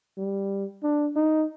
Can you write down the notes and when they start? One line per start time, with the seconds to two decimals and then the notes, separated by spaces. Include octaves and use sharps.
0.18 G3
0.83 D4
1.16 D#4